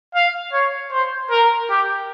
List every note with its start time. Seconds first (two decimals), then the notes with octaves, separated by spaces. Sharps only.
0.15 F5
0.53 C#5
0.92 C5
1.30 A#4
1.69 G4